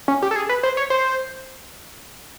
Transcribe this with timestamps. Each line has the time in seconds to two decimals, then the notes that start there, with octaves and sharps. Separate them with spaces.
0.08 C#4
0.23 G4
0.31 A4
0.36 G#4
0.49 B4
0.63 C5
0.77 C#5
0.90 C5